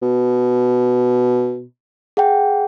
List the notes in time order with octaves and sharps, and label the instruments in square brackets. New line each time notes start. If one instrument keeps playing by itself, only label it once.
[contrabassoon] B2
[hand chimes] G#4 F#5 G5